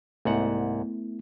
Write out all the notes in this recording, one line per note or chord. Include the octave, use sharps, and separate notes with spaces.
C2 G#2 A3 B3 E4 F#5